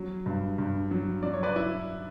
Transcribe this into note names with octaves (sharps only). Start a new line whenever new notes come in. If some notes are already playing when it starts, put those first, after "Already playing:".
Already playing: F#3
G2
G2
F#3
F#3 D5
C#5
B4 D5
E4